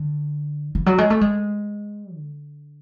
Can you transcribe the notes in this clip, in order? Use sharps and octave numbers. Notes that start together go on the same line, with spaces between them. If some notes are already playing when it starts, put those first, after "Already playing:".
Already playing: D3
E3
F#3
G#3
A3
G#3
D3